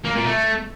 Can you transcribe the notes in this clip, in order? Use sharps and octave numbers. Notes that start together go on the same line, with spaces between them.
A#3
A#2
A3